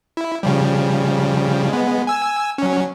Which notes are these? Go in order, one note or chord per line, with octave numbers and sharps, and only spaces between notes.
E4
C#3 F3 G3
G#3 B3
G#5 E6
F#3 C#4